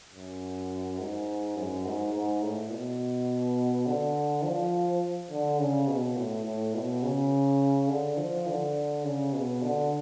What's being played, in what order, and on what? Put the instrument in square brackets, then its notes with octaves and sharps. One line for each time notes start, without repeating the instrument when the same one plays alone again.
[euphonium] F#2
G#2
F#2
G#2
G#2
A2
B2
D3
F3
D3
C#3
B2
A2
A2
B2
C#3
D3
F3
D3
C#3
B2
D3